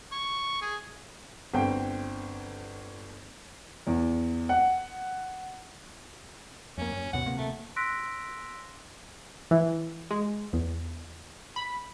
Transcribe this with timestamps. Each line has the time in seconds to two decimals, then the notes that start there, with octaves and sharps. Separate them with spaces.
0.12 C#6
0.62 G#4
1.54 G1 C4 G5
3.87 E2
4.49 F#5
6.78 F2 A#3 C#4
6.92 F#2
7.13 D#2 B2 F#5
7.26 D1 C3 A#3
7.38 A3
7.76 C6 E6 F#6 A#6 B6 D7
9.51 E3
10.11 G#3
10.53 E2
11.56 B5